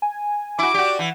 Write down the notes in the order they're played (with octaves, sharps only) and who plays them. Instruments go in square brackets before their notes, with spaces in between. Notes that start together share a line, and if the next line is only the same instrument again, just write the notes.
[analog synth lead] G#5
[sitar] E4 F#4 [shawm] D6
[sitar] F#4 G4 [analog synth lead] D5
[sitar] E3